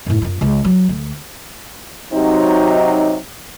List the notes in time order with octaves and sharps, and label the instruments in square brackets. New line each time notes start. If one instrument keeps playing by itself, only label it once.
[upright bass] F#2 A2
F#2 F4
C#2 C#3
F#3
D2
[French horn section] C3 F#3 D#4